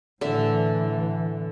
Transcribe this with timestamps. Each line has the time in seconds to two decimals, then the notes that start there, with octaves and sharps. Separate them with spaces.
0.21 A2 D3 E3 E5